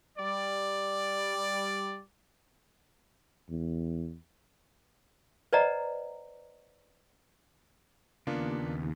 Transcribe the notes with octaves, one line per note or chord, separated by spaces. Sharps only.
G3 D5
E2
B4 C5 D5 D#5 F#5 A#5
D#2 C#3 A#3 B3 D4 F4